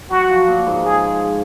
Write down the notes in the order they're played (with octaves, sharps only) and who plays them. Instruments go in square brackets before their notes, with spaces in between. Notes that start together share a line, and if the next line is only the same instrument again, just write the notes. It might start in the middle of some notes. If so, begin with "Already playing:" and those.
[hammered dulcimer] F#3 [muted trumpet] F#4
[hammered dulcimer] F3
A#2
G#2
[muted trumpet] G#4